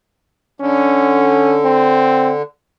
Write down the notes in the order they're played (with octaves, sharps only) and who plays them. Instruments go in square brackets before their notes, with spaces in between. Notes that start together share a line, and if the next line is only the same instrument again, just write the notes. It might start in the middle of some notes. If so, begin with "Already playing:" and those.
[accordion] D3 [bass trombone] C#4
[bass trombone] C4